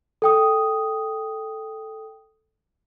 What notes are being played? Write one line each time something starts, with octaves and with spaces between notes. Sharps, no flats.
A4 G5 D#6